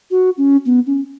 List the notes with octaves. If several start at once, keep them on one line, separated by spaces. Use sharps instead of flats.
F#4
C#4
B3
C#4